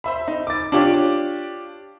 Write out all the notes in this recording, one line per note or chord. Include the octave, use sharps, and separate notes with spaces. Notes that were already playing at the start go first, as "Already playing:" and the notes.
C5 E5 B5
D#4
D6 A6
D4 F4 G4 C#5 D5 D6